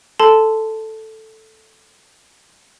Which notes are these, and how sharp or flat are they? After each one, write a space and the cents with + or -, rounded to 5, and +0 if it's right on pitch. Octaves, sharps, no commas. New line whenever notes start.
A4 +0 A5 +0 C6 -20